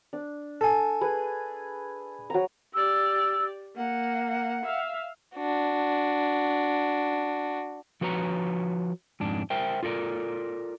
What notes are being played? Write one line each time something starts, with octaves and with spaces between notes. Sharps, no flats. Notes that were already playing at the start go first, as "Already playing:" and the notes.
D4
A4 G#5
G#4 B4
F#3 A#5
G4 D5 E6
A#3 F#5
E5 F5
D4 F#4
F3 F#4 B4 C#5 A#5
F2 G#2 D4
A#4 C5 E5 G5
F4 A4 A#4 D5